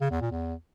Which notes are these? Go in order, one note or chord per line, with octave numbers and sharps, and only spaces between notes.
C#3
E2
A#2
E2